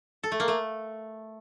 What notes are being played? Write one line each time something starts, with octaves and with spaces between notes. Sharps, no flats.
A4
A3
A#3
A3